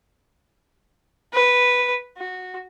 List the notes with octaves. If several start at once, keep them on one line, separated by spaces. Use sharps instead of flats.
B4
F#4